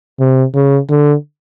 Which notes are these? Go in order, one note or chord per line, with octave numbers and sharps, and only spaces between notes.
C3
C#3
D3